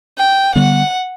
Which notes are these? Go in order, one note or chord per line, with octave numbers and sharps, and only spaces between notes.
G5
D3 G3 B3 F#5